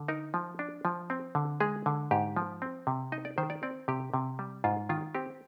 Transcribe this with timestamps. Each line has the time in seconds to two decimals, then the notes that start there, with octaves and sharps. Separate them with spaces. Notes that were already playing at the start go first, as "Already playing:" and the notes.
Already playing: D3
0.08 D#4 A#4
0.34 F3
0.59 D4
0.85 F3
1.10 C4
1.35 D3
1.60 G#3 G#4
1.86 D3
2.11 G#2 G4
2.36 F3
2.62 C4
2.87 C3
3.12 D#4 D#5
3.25 D5
3.38 D#3 C5
3.50 D5
3.63 C4 D5
3.88 C3 G4
4.14 C3
4.39 G3
4.64 G#2 F4
4.89 D#3 F4
5.15 C4 G4